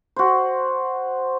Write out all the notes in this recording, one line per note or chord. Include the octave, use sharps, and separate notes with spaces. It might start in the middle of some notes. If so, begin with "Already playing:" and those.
F#4 C5